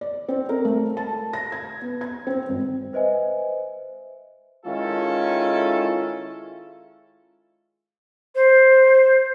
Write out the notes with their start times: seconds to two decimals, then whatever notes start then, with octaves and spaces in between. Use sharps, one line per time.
0.01 D5
0.28 C4
0.49 A#4
0.65 A3
0.97 A5
1.33 A#6
1.52 G#6
1.82 B3
2.01 G#6
2.27 C4
2.49 G#1
2.93 B4 C5 D#5 E5 G#5
4.66 D#3 G#3 C#4 E4 F4 A4
8.35 C5